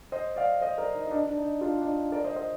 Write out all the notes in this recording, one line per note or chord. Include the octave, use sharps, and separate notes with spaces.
C5 D#5
D5 F5
C5 D#5
A#4 D5
D#4
D#4
D4
D4
D#4
D4 F4
D4
D#4
A#4 D5
C5 D#5
C5 D#5